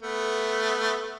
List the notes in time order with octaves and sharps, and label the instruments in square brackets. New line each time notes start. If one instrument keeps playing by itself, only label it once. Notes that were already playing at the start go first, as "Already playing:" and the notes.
[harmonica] A3 B3